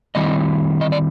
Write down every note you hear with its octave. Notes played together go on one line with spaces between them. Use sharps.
D#3 G3 C4 E4 D#5
D#5
D5